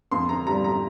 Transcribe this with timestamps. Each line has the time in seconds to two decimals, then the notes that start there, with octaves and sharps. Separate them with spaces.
0.11 F2 C6
0.29 D3 A#5
0.47 G3 A#5
0.64 A#5